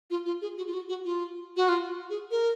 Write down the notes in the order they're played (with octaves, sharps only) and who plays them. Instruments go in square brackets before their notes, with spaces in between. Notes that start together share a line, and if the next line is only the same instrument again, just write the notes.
[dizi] F4
F4
G#4
F#4
F4
F#4
F#4
F4
F#4
F4
G#4
A#4